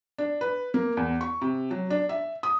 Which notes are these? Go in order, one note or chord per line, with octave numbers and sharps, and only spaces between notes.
D4
B4
A#3
E2
C#6
C3
F#3
D4
E5
D#6